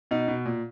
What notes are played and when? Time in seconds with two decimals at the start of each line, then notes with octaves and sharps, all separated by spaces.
0.11 B2 D#4
0.28 B2
0.46 A#2